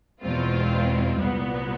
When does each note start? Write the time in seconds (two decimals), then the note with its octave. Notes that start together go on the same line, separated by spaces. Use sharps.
0.21 E2 B2 G#3 C4 F4
1.18 C2 A#2 G3 B3